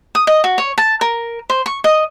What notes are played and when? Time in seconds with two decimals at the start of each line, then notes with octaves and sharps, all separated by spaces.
0.15 D#6
0.27 D#5
0.44 F#4
0.58 C#5
0.78 A5
1.01 A#4
1.50 C5
1.66 C#6
1.84 D#5